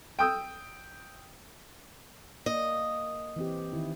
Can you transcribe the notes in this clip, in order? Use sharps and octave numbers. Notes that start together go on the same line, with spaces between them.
G5 D#6 E6
A#3 D#5
E3 C4 G4
D#3 E4